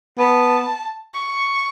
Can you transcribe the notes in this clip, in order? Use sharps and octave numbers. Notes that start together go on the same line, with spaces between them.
B3 A5
C#6